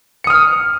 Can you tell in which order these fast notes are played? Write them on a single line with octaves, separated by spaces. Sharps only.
C#7 D#6 F6